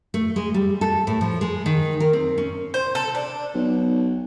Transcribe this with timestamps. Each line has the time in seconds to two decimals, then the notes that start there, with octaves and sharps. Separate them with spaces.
0.14 A3
0.36 G#3
0.54 G3
0.81 A4
1.07 A2
1.21 F3
1.41 G#3
1.66 D#3
2.00 A#4
2.13 C4
2.38 C#4
2.74 C5
2.95 A4
3.15 D4
3.54 B1